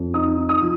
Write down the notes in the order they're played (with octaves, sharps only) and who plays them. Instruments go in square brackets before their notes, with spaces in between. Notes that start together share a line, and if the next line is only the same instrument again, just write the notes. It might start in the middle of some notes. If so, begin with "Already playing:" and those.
Already playing: [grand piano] F2
D#4 D#6
D#4
D#6
F3